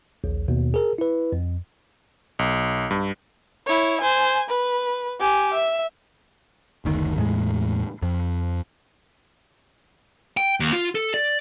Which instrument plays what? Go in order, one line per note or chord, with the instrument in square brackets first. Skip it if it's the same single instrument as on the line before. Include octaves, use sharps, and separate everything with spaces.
[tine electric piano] A#1 D#2
D#2 B2
G#4 A#4
E4 B4
F2
[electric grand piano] B1
G2
[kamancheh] E4 C#5
C5 G#5
B4
G4 G#5
E5
[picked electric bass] F#1 D2 D#3
E2 A2 G#3
F2
[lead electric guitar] G5
D#2
F4
A4
D5